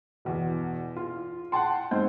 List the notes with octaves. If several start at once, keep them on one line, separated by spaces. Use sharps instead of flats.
E2 B2
F4
F#5 G5 A5 C6
G#2 C4 G6